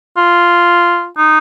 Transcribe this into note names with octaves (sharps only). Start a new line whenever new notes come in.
F4
D#4